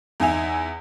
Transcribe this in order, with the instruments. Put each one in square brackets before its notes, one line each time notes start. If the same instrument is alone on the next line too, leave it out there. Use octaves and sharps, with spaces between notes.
[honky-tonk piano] E2 D#4 E5 G#5 F7